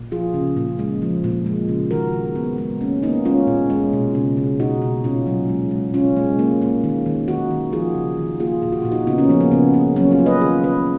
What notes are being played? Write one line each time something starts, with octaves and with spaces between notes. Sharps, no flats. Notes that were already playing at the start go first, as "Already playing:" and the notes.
Already playing: A#2
F3 F4 G#4
C#3
A#2
G#3
F3
A#2
G#3
C#3
D#3 F#4 A#4
D#3
A#2 B3
G#3 B3
A#3 C#4
A#3 B3 D#4
G#3 C#4 F4
A#2
G#3
B2
C#3
C#3
B2 D#4 F#4
B2
A#2 C#4 F4
F#3
G#3
G#3
B2 C#4 F4
G#3
A#3
A#3
D#3
D#3
D#3 D#4 F#4
D#3
F3 F4 G#4
C#3
D#3
A#3 F4 G#4
A#2 G#4
F#4
A#2 F4
D#4 F#4
C#3 B3 D#4
A#3 C#4
F3 B3
A#3
C#3 B3
A#3
F#3 A#3 C#4
C#4 F4
A#3
B4 D#5
D#3 F4 G#4
D#3 B4 D#5